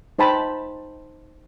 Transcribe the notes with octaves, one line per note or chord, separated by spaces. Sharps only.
D#4 C5 G5 A5 B5